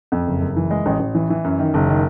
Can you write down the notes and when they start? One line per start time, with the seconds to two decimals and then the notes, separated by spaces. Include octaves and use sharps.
0.12 F2
0.27 F#1
0.41 F#1
0.56 E3
0.71 G#3
0.86 A1
1.00 A1
1.15 E3
1.30 E3
1.44 F#2
1.59 D#3
1.74 F#1
1.89 D#3